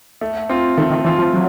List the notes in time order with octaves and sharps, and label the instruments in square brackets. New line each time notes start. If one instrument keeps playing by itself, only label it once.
[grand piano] A3
C4 F4
[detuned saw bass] D#3 [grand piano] A3
[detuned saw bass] D#3
[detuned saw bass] E3 [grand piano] C4 F4
[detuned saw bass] F3
F#3